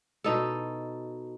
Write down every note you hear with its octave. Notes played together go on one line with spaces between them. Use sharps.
B2 D#4 A4